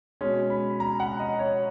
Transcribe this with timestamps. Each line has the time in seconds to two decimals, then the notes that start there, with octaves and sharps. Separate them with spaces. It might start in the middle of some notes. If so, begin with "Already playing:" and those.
0.21 B2 G#3 C#4
0.50 B5
0.80 A#5
1.00 F#5
1.20 D#5
1.39 C#5